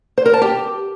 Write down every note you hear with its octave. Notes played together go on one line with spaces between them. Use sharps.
C5
A#4
A5
G4